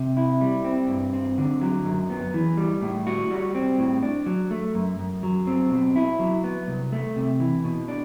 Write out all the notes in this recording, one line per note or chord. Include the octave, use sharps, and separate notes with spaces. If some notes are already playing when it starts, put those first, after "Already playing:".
Already playing: C3
E4
G3
C4
G2
C4
D3
F#3
F#2
B3
E3
G3
A2
F#4
G3
C4
A2
D4
F#3
A3
F#2
F#2
F#3
C4
B2
E4
F#3
B3
C2
A3
C3
E3
B2
D4